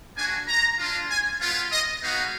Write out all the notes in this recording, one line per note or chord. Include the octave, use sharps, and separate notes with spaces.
A#3 D4 F#4 G#5
A#5
G#3 D4 F4
G#5
G#3 B3 F4
D#5
G#3 B3 D#4 F#4 F5